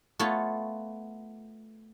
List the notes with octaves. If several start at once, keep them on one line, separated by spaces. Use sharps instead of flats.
A3 B3 F4 C#5